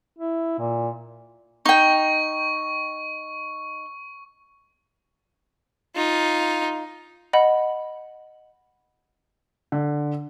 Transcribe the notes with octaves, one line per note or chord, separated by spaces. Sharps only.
E4
A#2
D#4 G5 C#6
D#4 F4
D#5 F#5 B5
D3